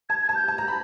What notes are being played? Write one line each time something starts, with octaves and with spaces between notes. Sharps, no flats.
A5 G#6
G#6
A5
G6
A5
A#5
B5